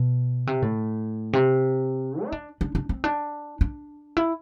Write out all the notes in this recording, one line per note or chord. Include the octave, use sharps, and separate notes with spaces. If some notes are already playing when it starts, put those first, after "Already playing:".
Already playing: B2
C3
A2
C3
E4
D4
D4
D4
C4
D4
D4
E4